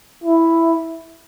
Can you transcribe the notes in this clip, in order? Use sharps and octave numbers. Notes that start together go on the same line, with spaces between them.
E4